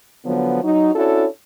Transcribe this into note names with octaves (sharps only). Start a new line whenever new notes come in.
D3 F3 F#3 B3
F#3 D#4
C#4 D4 E4 F#4 A4 C#5